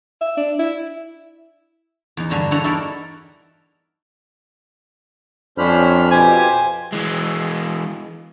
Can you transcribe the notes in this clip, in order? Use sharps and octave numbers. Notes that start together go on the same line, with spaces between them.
E5
D4
E4
E2 D#4
G2 D3 F#4
E2 G2 A4 C#5 F#5 A#5
D#4 E4 F#4 A4 A#4 D5
F2 C#4 D4 C5 B5 F6
B2 F3 G4 C5 G#5
E3 G#3